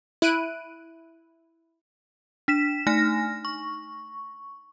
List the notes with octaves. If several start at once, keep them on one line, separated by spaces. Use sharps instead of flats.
E4 F#6 D7 D#7
D4 B6 E7
A3 D#4 G#5 F6 A#6
C#6